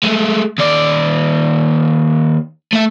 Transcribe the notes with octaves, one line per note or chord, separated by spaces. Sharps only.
G#3 A3
D#2 D5
A3 E5